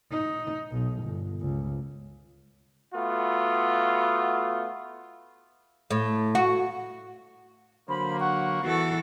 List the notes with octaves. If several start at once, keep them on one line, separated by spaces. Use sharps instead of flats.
D#4
B1
G1
C#2
A3 B3 F4 F#4
A2
F#4
D3 F#3 A#3 C5 B5
F#5 C#6
E2 E3 F#4 A4